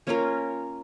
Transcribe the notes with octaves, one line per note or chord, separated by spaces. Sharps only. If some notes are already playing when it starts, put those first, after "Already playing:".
A#3 C#4 F4 A#4